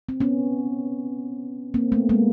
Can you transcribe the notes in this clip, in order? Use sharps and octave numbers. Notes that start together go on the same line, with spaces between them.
C4
B3 C#4
A#3 C4
A3 B3
G#3 A#3